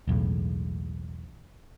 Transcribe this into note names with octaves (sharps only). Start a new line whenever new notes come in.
E1 B1 E2 A2